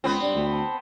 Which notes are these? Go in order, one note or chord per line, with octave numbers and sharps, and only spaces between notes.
C#2 B3 C4
G2 D5
D2
A5